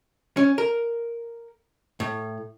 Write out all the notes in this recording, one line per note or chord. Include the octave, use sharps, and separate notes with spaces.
C#4
A#4
A2